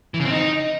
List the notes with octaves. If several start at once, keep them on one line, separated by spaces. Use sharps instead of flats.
E3
C#3
C4
D#4